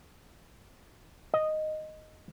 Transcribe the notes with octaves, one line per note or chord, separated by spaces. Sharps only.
D#5